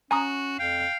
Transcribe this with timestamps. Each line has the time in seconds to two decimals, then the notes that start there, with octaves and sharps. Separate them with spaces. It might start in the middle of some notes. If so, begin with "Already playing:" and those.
0.11 C#4 F#4 G#5 A#5 D#6
0.60 F2 F5 G5